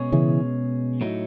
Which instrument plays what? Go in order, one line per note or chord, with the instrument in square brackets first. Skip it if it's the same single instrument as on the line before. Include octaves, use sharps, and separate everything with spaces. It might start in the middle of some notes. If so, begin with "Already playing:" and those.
Already playing: [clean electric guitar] B2 G#3 C#4 G#4 C#5
[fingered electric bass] C#3 E3
[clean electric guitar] A2 F#3 A3 D#4